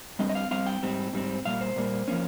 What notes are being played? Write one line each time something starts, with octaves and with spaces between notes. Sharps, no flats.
G2 G3 C4 D#5
D#5
F5
G2 G3 C4 F5
G5
G#2 G3 C4
G#2 G3 C4
A#2 G3 A#3 F5
C5
A#2 G3 A#3
F3 A#3 C#4